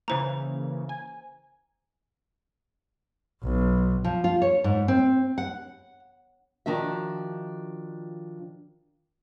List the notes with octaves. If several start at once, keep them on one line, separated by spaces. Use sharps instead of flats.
C#3 E3 A#3 C5 A#5
G#5
B1
F3
F4
C#5
G#2
C4
F#5
D#3 F3 D4 F#4 E5